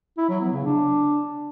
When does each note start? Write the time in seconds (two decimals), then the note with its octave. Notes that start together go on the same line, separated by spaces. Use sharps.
0.17 E4
0.29 F#3
0.41 B3
0.53 C#3
0.64 D4